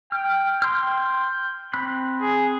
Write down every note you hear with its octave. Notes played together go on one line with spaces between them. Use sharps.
G5 F6
G5 C6 F6 G6
C4 B5 F#6
G#4